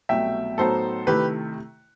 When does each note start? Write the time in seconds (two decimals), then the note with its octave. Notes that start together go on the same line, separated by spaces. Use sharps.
0.09 C2 B2 F#3 A3 E5 G5
0.58 A2 F#3 B3 D#4 A4 C5
1.07 C3 D#3 A3 E4 G4 B4